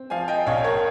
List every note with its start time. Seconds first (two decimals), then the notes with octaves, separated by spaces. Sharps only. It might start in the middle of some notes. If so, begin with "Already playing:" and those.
Already playing: C4
0.10 F3 F5 G#5
0.28 D#5 G5
0.46 A#1 C#5 F5
0.64 A#4 C#5